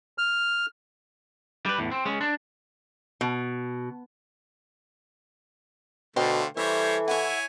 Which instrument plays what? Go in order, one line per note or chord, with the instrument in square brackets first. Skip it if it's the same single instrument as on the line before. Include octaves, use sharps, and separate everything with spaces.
[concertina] F6
[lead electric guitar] G3 B4
E2 A2
C4
G#3 C#4
D4
[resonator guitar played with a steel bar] B2
[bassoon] B2 [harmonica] D3 A3 [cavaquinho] C5 F5 G5
[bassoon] E3 [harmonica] G3 C5 C#5 [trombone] A4 [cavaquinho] E5
[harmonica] E4 C#5 G#5 [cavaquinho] E5 F#5